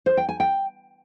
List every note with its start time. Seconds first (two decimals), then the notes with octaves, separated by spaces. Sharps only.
0.06 C5
0.17 G5
0.29 G#5
0.40 G5